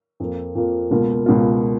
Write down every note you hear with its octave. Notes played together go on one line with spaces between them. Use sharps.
F2 F3 A#3
F2 F3 A#3
C#2 B2 A#3 F4
C#2 B2 A#3 F4